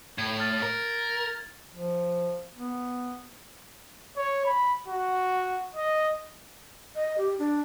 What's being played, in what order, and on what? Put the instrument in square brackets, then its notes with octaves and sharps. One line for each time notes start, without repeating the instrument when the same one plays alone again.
[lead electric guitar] A2 [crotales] G#6
[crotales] F6 A6
[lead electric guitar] A#4
[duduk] F3
B3
[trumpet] C#5
B5
F#4
D#5
[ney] D#5
G4
D4